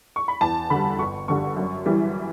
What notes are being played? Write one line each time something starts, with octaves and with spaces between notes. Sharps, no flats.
C#6
B5
E2 A5
D3 G3 B5
G1 C#6
G2 D3 G3 C#6
F#2
E3 G3